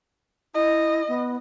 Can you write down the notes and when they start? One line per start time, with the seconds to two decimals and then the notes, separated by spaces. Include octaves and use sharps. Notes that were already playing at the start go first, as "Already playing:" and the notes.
0.54 E4 D#5
1.08 B3